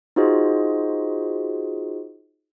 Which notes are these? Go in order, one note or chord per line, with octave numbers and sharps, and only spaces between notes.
D#4 F4 F#4 G#4 C5 D#5